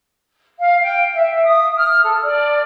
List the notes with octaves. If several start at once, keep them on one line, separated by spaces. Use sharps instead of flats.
F5
G5
E5
D#6
F6
A4
D5